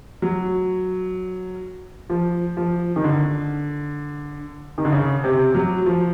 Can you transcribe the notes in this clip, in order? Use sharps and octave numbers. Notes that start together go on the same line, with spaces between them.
F#3
F3
F3
D#3
D3
D#3
D3
C#3
C3
F#3
F3